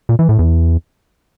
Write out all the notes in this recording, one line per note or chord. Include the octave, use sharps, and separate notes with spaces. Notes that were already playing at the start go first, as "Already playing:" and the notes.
A#2
E3
A2
E2